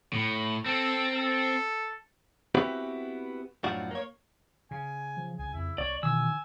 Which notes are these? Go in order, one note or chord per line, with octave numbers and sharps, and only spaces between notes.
A2
C4 A4
A4
B3 C4 E4 F#4 G4 B4
F#2 A2 F3 D4 F#4
A#3 C#5
C#3 G#5
F3
C2 G#5
F2 E4
C2 C#5 D5
B2 D#3 E3 G#5 E6